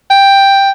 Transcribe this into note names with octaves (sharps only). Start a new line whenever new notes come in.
G5